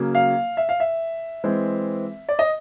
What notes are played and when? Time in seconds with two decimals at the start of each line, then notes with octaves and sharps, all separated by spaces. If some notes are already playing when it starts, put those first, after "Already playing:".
Already playing: C#3 F#3 A#3
0.15 F5
0.57 E5
0.69 F5
0.80 E5
1.44 E3 G#3 C4
2.29 D5
2.39 D#5